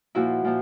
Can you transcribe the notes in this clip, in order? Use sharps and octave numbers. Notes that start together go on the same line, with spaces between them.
A#2 F3 E4 F#4
A#2 F3